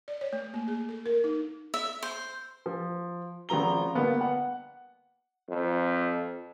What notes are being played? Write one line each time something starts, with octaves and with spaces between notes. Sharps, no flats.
D5
C#5
A3
A#3
G#4
A4
A#4
D#4
E5
C5
F3
G#1 C#3 F3 A#5 G7
G1 A#3 B3
F#5
F2